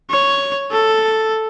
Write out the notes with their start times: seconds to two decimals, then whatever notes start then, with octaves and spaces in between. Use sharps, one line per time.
0.10 C#5
0.71 A4